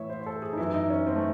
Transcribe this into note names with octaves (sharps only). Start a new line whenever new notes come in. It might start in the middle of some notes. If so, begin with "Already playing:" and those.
Already playing: A2 E3 C#5 E5
C5
C5
A4
G#4
D#4
F#2 E3 E4
D#4
C#4
C4
A3